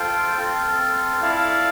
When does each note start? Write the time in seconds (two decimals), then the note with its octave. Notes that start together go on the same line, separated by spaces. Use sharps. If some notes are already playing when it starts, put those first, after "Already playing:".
Already playing: F4 A4 C5 G5
0.37 C4 F4 A4
1.21 E4 A4 D5 F5 A5